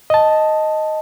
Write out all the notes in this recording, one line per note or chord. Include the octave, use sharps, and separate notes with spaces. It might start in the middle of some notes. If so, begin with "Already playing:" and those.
D#5 A5